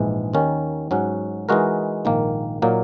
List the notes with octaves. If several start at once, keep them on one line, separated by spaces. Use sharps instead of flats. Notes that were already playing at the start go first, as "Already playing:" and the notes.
Already playing: A#1 G#2 E3 G#3
D#2 D#3 A#3 C#4
G#2 F#3 C#4 F#4
E3 G#3 D#4 F#4 A#4
A#1 G#2 D#3 A#3
A#2 F#3 A#3 D#4